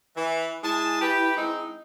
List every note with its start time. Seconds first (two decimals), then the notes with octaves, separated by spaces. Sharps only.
0.16 E3
0.63 G#3 E4 G#5 A5
1.01 G4 B4
1.36 G#3 C4 D#4